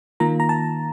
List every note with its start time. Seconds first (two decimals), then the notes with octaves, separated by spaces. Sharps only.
0.20 D#3 A#3 F4 A#5
0.40 A#5
0.49 A5